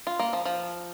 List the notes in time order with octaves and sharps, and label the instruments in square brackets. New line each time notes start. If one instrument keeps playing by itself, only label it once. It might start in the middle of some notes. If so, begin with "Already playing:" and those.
[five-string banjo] F4
A#3
F3
F3